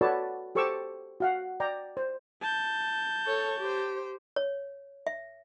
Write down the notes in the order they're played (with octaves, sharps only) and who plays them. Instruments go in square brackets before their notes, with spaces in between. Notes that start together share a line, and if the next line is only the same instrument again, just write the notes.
[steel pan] F#4 A4 B4 C#5 D5 A5
G4 A4 C5 C#6 D6 E6
F#4 F5 F#5
D5 G5 A#5
C5
[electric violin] A5 G6
[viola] A4 C#5
G4 C5
[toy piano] C#5
E5